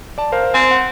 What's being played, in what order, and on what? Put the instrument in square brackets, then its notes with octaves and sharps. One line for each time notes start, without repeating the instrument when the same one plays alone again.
[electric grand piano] D5 A5
A#4 C5 F5
[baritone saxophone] C4 [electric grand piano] G#5
[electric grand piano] F#5